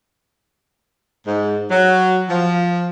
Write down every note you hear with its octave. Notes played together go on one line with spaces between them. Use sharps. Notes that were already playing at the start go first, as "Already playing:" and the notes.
G#2
F#3
F3